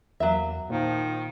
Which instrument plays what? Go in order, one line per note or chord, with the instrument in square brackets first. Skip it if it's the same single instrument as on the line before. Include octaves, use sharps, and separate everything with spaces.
[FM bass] E2 [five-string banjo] F#3 E5 [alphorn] A#3
[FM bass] A#2 [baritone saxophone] D#3 [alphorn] F3